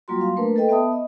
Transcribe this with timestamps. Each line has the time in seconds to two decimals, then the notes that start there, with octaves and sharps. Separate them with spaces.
0.08 F#3 G3 A#3 F4 F#4 C6
0.21 F5 C6
0.37 A3 A#3 D4 A#4 B4
0.56 A4 B4 D#5 G5
0.69 B3 E5 A5 B5 D#6
0.92 D#5